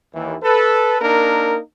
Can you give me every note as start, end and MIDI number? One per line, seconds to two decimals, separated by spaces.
0.14 0.36 39
0.14 0.36 52
0.43 0.99 69
0.43 0.99 71
1.01 1.59 58
1.01 1.59 62
1.01 1.59 63
1.01 1.59 70